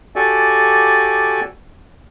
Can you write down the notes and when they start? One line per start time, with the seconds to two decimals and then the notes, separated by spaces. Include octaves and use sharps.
0.16 F#4 G4 A4 D5 G#5